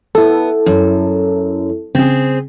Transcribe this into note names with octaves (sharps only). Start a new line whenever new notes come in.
B3 E4 A4
F#2
C#3 C4 G#4